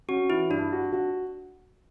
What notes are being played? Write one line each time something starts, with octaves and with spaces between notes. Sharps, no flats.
C#4 F#4
E3 E4
G2 D4
F#4
F#4